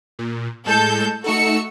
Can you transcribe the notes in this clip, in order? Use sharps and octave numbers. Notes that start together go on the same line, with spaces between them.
A#2
A2 G#3 A4 G6 E7
A3 D#4 F#4 A4 E6 C#7